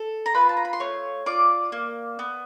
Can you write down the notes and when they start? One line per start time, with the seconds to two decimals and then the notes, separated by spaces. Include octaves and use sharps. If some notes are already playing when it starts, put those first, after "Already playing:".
Already playing: A4
0.26 A#5
0.34 F4 B4 B5
0.49 A5
0.57 A#5
0.65 B5
0.73 C6
0.80 A3 C#5 C#6
1.26 F4 D5 D6
1.72 A#3
2.19 B3